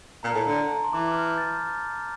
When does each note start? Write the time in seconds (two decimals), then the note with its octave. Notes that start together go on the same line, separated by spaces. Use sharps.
0.23 A#2 A#5
0.32 A2 A5
0.42 A#5
0.47 D3 A5
0.58 A5
0.76 A#5
0.84 C6
0.93 E3 D6
1.12 F6
1.29 G6
1.38 A6